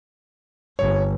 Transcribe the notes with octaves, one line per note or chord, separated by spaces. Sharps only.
G1 C#5